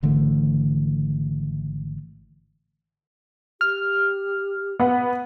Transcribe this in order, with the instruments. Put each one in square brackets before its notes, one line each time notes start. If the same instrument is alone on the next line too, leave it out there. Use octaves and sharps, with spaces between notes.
[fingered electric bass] G#1 D3 E3 A3
[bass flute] G4 [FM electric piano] F6
[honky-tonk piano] B3 F#5